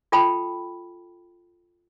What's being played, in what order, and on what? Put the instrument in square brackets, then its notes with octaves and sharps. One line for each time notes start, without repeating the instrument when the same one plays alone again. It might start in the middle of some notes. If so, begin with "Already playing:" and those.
[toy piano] F4 A4 G5 A5 B5